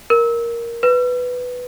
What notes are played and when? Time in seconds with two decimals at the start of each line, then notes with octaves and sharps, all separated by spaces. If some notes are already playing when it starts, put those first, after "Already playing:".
0.10 A#4
0.83 B4